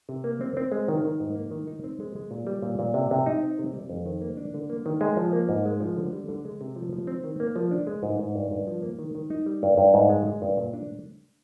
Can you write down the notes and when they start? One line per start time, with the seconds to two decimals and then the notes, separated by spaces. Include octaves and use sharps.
0.09 C3
0.24 A#3
0.41 C4
0.57 C4
0.72 G#3
0.88 D#3
1.05 D#3
1.20 G#2
1.35 A#3
1.51 D#3
1.67 D#4
1.84 C4
2.00 G#3
2.16 G#3
2.31 A#2
2.47 G3
2.62 A#2
2.79 A#2
2.94 C3
3.11 C3
3.26 D#4
3.43 C4
3.59 C3
3.74 G3
3.89 F2
4.06 D#3
4.21 A#3
4.37 D4
4.54 D3
4.70 A#3
4.86 D#3
5.01 G#3
5.17 F3
5.33 A#3
5.49 G#2
5.66 G#3
5.80 F3
5.96 D3
6.13 G3
6.28 D3
6.45 G#3
6.61 C3
6.76 F3
6.93 F3
7.07 C4
7.24 D#3
7.40 A#3
7.56 F3
7.71 D4
7.87 G#3
8.03 G#2
8.19 G#2
8.35 G2
8.51 G2
8.67 F3
8.82 A#3
8.99 D#3
9.15 D#3
9.30 D#4
9.46 G3
9.63 G2
9.78 G2
9.94 G#2
10.09 G#3
10.26 G#3
10.42 G2
10.57 A#2
10.73 D4